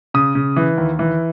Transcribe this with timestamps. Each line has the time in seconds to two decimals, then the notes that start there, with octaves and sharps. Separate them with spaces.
0.14 C#3 D#6
0.35 C#3
0.56 E3
0.78 D#2
0.99 E3